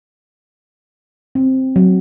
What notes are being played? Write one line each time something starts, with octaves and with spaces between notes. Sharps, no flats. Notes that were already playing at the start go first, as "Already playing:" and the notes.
C4
F#3